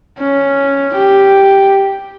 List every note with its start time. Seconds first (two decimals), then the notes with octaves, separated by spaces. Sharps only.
0.19 C#4
0.94 G4